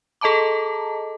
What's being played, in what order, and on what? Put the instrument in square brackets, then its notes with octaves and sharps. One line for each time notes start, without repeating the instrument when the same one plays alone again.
[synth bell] G#4 A4 D#5 A5 A#5 D6